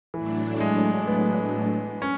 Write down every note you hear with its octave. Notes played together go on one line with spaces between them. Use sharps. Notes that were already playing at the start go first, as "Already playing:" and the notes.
A2 E3 F#3 A3 D4
G#3
B3
C#4